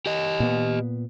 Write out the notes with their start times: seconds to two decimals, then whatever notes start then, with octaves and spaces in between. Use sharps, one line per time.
0.06 G4 D#5
0.40 A#2 B3